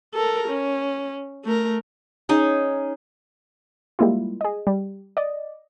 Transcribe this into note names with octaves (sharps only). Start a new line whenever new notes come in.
A4 A#4
C#4
A3 A#4
C#4 D#4 G#4 G#5
G3 G#3 A#3 E4 F4
G#4 D#5
G3
D5 D#5